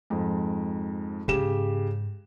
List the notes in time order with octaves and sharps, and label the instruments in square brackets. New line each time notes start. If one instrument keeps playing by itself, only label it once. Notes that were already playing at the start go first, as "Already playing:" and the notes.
[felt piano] F2 G#2
[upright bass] G#2 [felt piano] C#3 G4 E7